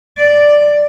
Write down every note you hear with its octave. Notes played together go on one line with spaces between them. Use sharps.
D5